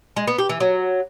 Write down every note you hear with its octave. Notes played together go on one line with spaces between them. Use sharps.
G#3
B3
G4
E3
F#3